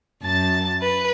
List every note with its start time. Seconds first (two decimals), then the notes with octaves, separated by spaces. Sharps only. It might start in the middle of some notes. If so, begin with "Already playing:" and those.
0.22 F#2 A5 A6
0.81 B4